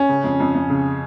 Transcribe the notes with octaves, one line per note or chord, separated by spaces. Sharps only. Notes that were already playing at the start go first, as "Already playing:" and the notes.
Already playing: C#4
C#3
F2
F2
F2
C#3